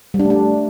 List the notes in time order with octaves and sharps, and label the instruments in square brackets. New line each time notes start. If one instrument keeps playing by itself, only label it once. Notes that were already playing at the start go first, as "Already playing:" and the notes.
[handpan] G3
D4
A3
D4